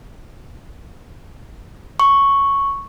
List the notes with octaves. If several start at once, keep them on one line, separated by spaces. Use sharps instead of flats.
C#6